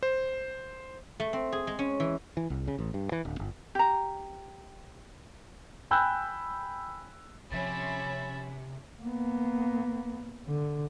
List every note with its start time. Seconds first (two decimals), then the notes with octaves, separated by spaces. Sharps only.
0.03 C5
1.20 A3
1.33 C4
1.52 G#4
1.67 G#3
1.79 C#4
2.00 E3
2.37 E3
2.50 C2
2.67 C#3
2.79 A1
2.94 G2
3.12 E3
3.25 D1
3.39 G1
3.75 G4 A#5
5.91 G5 G#5 B5 E6 F#6 G6
7.52 C3 F3 C#4 E5 B5 A6
9.02 A#3 B3
10.47 D3